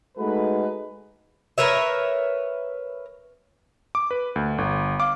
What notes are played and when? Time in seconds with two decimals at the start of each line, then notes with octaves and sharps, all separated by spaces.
0.17 G#3 A3 D#4 F#4 A4 B4
1.58 A#4 B4 C#5 E5
3.95 D6
4.11 B4
4.36 D2
4.58 G1
5.00 F5 D6